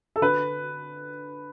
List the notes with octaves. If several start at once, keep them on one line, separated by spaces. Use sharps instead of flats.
A4
D3 B4